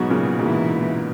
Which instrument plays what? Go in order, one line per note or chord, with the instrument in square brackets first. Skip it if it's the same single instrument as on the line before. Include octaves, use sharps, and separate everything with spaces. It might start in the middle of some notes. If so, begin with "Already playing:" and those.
Already playing: [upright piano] G#2 B2 [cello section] F#3 B3 F#4
[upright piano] A#2 C#3
[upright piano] G#2 B2 [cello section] E3 A#3 E4